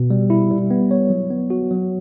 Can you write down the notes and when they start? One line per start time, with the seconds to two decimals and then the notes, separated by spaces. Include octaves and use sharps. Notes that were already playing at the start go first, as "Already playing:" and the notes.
Already playing: B2
0.10 G3
0.30 E4
0.50 G3
0.71 B3
0.91 C#5
1.10 F#3
1.30 B3
1.50 F#4
1.71 F#3